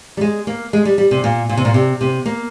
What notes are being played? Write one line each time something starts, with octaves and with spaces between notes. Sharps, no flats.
G3
G#3
A#3
G#3
G3
G3
C3
A#2
A#2
C3
A#2
C3
C3
A#3